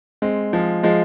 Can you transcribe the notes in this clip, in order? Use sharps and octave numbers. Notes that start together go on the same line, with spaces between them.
G#3 C4
F3 G#3
F3 G#3